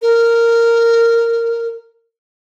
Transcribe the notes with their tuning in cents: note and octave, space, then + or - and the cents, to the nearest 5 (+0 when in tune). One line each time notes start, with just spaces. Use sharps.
A#4 -10